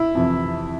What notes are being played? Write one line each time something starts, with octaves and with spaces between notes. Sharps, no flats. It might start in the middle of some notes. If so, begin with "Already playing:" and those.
Already playing: E4
F2 C3 E3